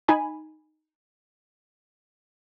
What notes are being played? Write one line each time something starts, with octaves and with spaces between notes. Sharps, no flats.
D#4 G#5 B5